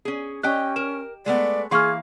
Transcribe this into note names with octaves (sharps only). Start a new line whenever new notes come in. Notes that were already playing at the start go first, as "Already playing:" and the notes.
C#4 G#4
C#4 G4 D#5 G5 F#6
A#4 E7
G#3 A3 B3 D5
E3 A#3 G#4 F5 C6 C#6 F6